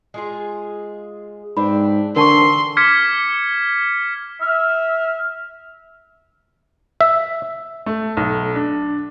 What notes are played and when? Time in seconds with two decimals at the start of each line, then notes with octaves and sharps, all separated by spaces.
0.14 G#3 F4 G#4
1.57 G#2 C4 D4 B4 B5
2.16 D3 E3 C4 A#4 A5 C6 C#6
2.77 D6 F6 G#6 B6 C#7
4.41 E5 F6
7.01 E5
7.86 A3
8.17 B1
8.56 D4